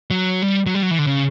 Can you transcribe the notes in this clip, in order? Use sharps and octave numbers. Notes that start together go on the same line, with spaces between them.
F#3
G3
F#3
G3
F#3
E3
D3
C#3